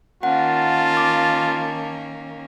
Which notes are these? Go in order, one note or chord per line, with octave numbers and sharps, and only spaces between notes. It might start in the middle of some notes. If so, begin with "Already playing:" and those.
D#3 A#3 C#4 F4 F#5 A5
D6